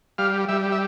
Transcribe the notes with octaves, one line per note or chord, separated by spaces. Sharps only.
G3 F5
G3 E5
E5